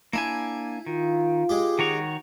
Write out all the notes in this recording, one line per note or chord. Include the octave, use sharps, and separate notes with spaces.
A#3 D4 E4 G#5
D#3 F4
G#3 G4
D#3 F#4 C#5